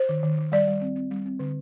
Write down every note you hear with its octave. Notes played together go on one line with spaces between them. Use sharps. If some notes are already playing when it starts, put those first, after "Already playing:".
Already playing: C5
D#3
D#3
D#3
G3 D5
G3
C4
C4
G3
C4
D3